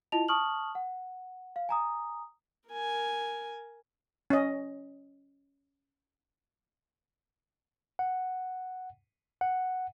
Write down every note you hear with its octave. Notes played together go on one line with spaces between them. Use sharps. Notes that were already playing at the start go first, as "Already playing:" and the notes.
E4 F4 D#5 A5 F7
A5 C#6 D#6 F6 F#7
F#5
F5
G#5 A#5 D#6
A#4 G#5
C#4 D#5
F#5
F#5